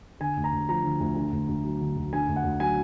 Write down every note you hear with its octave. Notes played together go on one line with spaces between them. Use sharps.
D3 G#5
D2
A#5
D2
F3 A#5
D3
D2
D3
D2
D2
F#3
D3
D2
D3 G#5
D2
F#5
D2
F#3 G#5